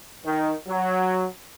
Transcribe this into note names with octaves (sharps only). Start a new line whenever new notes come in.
D#3
F#3